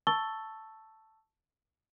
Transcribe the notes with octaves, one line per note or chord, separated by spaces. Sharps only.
A5 C#6 E6 A6 G7